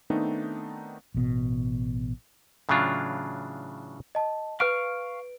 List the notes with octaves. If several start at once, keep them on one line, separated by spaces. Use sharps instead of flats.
D#3 A3 B3 C4 D4 D#4
A1 B2
A2 C#3 E3 F#3 D4 F4
D#5 A5
B4 F5 C#6 F6 D7